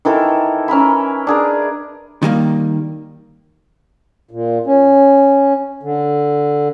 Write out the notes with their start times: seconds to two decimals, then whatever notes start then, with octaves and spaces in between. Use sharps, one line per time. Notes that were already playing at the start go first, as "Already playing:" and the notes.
0.05 D#3 E3 A4 A#4
0.68 C#4 A#4 E5 B5
1.27 D4 G#4 A#4
2.23 D#3 G3 A#3
4.31 A#2
4.66 C#4
5.83 D3